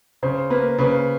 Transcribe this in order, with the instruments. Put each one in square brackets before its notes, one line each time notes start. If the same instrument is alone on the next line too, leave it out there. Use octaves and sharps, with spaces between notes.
[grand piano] C#3 [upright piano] C5
[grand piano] A#3 [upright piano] B4
[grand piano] C#3 [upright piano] B4